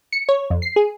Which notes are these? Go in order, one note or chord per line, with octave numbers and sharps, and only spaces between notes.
C#7
C#5
F2
C7
G#4